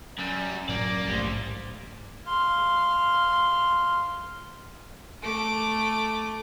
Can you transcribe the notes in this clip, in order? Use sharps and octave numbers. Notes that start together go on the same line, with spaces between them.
F#2 G3
A2 F#3 A#3 C#4 D5
A#1 G#2 G3 A3 C5
F5 C6
A3 D6